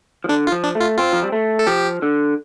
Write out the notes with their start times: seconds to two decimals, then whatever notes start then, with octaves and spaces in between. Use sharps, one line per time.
0.24 F3
0.29 D3 D4
0.47 F4
0.52 F3
0.64 D4
0.75 A3
0.80 F4
0.98 C4 F4
1.13 F3
1.23 G3
1.32 A3
1.59 A4
1.67 F3 G4
2.02 D3